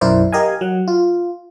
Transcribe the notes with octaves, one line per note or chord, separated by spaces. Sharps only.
B1 F#2 E4 A#4 C5 D5
G4 A#4 D#5 F5 G#5
F#3 F#5
F4